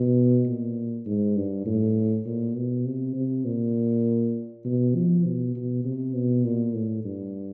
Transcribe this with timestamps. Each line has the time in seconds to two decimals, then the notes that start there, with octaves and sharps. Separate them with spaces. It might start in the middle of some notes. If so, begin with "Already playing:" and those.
Already playing: B2
0.46 A#2
1.06 G#2
1.36 G2
1.66 A2
2.26 A#2
2.56 B2
2.85 C3
3.15 C3
3.45 A#2
4.65 B2
4.95 F3
5.25 B2
5.55 B2
5.85 C3
6.15 B2
6.44 A#2
6.74 A2
7.04 G2